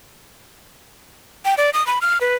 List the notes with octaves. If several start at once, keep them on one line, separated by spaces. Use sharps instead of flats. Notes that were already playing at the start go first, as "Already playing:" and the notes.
G5
D5
D#6
B5
F6
B4